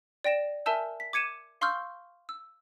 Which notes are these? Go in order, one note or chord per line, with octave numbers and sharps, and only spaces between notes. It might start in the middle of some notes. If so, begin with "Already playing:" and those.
D5 G5 A#6 E7
A#4 E5 G#5 A5 E6 G6
B6
D6 G#6 C#7 D#7 E7
F5 C6 C#6 E6 F6 G6
E6